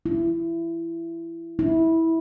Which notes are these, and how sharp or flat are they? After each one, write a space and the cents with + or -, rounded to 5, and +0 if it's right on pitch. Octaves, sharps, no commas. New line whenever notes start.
E4 +20
E4 -15